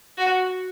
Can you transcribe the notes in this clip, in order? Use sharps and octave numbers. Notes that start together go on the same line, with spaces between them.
F#4